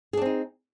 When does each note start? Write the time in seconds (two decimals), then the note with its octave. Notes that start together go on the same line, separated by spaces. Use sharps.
0.13 G#4
0.17 D4
0.21 C4
0.26 D#4